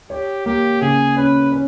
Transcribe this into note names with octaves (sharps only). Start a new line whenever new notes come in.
G4 C#5
A#3 G4
C#3 G#4
C#4 B4
C#4